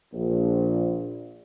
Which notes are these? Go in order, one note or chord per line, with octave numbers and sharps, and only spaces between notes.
A#1